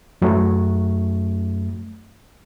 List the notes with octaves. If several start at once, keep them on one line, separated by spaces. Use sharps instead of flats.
F#2 F#3 A3